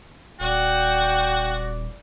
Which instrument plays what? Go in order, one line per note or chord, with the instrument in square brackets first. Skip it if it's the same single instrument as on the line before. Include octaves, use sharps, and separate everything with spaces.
[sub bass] D#1 [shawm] F#4 [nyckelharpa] D5 [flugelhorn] G5